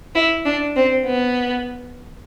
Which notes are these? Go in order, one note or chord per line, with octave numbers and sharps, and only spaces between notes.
E4
D4
C4
B3